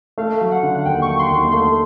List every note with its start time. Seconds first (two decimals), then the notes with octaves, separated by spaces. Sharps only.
0.18 A3 F5
0.41 F#3
0.52 F#5
0.63 D3
0.75 F#5
0.85 D#2 G5
1.02 C#6
1.07 F#3
1.19 C6
1.30 D#2
1.52 A3 C6